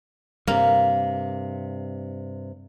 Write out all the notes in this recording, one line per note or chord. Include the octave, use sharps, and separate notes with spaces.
G2 C3 A#3